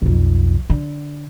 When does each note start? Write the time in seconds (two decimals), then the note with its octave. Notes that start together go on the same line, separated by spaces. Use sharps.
0.02 B1 F2
0.70 D3